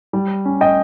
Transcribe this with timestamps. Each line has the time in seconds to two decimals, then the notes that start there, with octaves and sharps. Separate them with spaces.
0.13 G3
0.45 C#4
0.61 D#5 G5